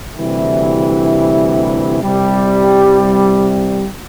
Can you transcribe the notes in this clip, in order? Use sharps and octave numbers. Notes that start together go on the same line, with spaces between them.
D2 C3 E3 G3 E4
C2 C3 G3